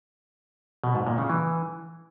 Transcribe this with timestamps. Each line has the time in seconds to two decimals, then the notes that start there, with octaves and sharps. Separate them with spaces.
0.84 B2
0.95 G#2
1.07 A#2
1.18 C#3
1.30 E3